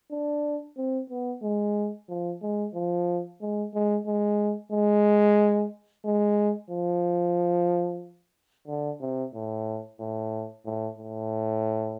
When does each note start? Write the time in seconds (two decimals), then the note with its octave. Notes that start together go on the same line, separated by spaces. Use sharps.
0.11 D4
0.77 C4
1.10 B3
1.43 G#3
2.09 F3
2.42 G#3
2.75 F3
3.41 G#3
3.74 G#3
4.06 G#3
4.72 G#3
6.05 G#3
6.70 F3
8.68 D3
9.01 C3
9.34 A2
10.00 A2
10.66 A2
10.98 A2